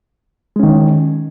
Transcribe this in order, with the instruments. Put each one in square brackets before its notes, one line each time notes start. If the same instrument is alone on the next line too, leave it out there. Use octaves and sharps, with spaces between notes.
[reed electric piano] G#3
C#4
D#3